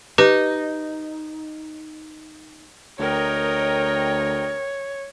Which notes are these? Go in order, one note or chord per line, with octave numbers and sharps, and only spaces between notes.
D#4 G4 B4
D2 A#4 C#5 D#5 G5